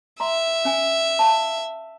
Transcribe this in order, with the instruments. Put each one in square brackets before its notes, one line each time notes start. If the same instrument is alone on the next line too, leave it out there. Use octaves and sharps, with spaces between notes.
[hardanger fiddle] E5 [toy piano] A#5 C6
[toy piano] C#4 G#5
F5 A5